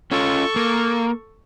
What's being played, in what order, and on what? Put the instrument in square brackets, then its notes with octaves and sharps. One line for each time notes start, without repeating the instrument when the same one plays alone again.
[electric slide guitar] C#4 F4 [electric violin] A4 C#6
[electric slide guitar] A#3